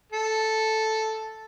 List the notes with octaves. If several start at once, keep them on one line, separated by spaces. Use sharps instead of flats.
A4